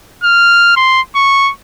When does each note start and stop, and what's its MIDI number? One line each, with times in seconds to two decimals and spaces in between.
0.23 0.71 89
0.76 1.01 84
1.15 1.51 85